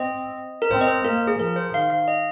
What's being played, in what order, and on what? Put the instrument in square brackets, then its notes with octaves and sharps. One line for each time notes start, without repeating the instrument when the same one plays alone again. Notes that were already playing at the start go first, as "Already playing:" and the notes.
Already playing: [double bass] C4 [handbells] D#5
[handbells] A#4
[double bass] C4 [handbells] C5
[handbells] D#5
C5
[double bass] A#3 [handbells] A#4
[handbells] G#4
[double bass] F3 [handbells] A#4
[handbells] C5
[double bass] D#3 [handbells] F5
[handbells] F5
D#5